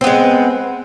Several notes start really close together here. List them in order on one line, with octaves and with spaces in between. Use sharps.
C4 B3 G#3